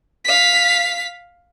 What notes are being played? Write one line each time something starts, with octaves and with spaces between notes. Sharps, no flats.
F5 B6